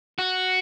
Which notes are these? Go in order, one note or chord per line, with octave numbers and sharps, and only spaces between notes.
F#4